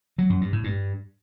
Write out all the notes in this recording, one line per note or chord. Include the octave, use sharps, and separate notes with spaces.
F#3
F#2
G2
A2
G2